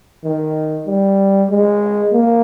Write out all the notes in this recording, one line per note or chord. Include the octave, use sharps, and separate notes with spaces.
D#3
G3
G#3
A#3